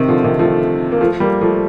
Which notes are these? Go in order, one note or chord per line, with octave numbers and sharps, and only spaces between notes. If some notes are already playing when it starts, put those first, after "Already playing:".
Already playing: C3 D#3
D3 F3
C3 D#3
F3 A3
A#3
F3 A3
G3 A#3
F3 A3